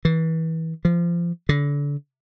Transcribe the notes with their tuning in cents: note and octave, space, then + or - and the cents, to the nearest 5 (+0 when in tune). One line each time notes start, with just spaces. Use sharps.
E3 -30
F3 -25
D3 -30